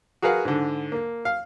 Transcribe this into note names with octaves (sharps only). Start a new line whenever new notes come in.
F#4 G#4 A#4 B4 F5 F#5
G#2 D3
A#3
F5